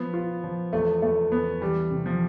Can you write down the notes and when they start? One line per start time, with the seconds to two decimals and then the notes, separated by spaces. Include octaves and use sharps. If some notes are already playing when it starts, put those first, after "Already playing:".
Already playing: F3 B3
0.14 F4
0.44 F3
0.73 E2 A3
1.02 E2 A3
1.32 E2 B3
1.61 E3 G3
1.91 C3
2.06 F3